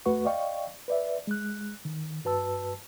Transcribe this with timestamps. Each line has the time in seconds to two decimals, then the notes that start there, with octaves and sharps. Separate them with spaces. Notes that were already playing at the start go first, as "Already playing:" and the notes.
0.06 E2 A3 F#4 B4 F#5 C#6
0.25 D5 D#5 F5 G5 C#6
0.88 B4 D5 E5
1.27 G#3 F#6
1.85 D#3
2.24 G2 F#4 B4 A5 E6